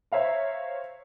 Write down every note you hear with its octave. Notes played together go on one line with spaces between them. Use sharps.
C5 C#5 E5 F5 A#5